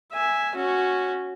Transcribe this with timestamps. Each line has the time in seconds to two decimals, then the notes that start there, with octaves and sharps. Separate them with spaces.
0.12 E5 G#5
0.55 C#4 F#4